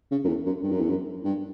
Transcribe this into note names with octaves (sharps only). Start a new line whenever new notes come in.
C#3
F#2
E2
F#2
G2
F#2
E2
F#2
G2